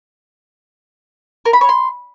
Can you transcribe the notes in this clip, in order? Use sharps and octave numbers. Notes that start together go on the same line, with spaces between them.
A#4
B5
C#5
C6